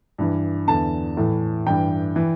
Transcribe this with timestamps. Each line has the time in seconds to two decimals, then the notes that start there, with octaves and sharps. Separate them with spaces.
0.18 G2 E3
0.68 E2 D3 A5
1.17 A2 E3
1.67 G2 E3 G5
2.16 E3